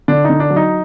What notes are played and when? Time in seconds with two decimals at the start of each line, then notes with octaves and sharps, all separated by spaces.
0.08 D3 D4
0.24 D#4
0.30 D3
0.40 D4
0.50 F#3
0.56 D#4